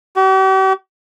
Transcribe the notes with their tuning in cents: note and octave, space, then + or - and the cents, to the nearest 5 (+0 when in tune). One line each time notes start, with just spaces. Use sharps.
G4 -45